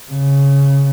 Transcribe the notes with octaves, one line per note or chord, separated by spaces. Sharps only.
C#3